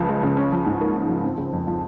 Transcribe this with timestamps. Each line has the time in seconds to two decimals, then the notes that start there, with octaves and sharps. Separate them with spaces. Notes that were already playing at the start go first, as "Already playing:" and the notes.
Already playing: C#2 C#3 F3
0.09 G#3
0.23 C#3
0.37 C#4
0.52 F3
0.66 G#2
0.81 A#3
0.95 C#4
1.09 F3
1.24 C4
1.38 C#3
1.53 F2
1.67 F3